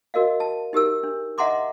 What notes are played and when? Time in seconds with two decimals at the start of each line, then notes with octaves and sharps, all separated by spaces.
0.14 F#4 A#4 D#5 F5
0.40 A5
0.73 D#4 G4 A#4 E6
1.03 D4
1.38 D#5 E5 F#5 A#5 C6 D6